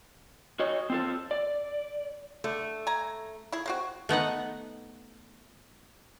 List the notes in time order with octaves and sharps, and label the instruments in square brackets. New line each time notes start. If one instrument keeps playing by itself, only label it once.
[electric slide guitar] F#4 C#5 D#5
C4 F4 A4
D5
[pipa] D3 [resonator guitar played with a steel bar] A3
[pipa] G#5 A#5
E4 G#4
G#3 C4 F#4
[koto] A3 B3 D#4 F#5